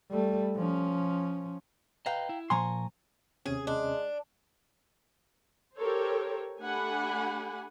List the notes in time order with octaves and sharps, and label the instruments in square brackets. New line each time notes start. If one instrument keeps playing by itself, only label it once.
[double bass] G3 A3
F3 C#4
[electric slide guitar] B4 D#5 [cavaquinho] F5 G5 A#5
[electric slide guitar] E4
[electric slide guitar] A#2 [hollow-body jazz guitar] F3 C6 [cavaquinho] G#5 A#5 C#6
[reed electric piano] D#2 C3 C#4 [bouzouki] G#4
[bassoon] G#3 [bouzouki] D4
[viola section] G4 A4 A#4 C5 C#5
A3 D4 G4 F#5 G#5 B5